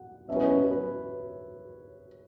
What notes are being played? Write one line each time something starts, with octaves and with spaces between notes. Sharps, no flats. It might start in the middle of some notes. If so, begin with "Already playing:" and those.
Already playing: F#5
E2 B2 F#3 C#4 E5
B4
C#5
B4
B4